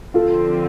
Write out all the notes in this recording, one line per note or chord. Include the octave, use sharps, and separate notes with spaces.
D3 F3 C4 F4 A4